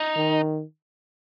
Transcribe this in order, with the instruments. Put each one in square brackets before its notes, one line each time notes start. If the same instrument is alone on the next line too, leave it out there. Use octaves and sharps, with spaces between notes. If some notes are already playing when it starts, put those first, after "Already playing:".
Already playing: [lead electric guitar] D#4
[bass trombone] D#3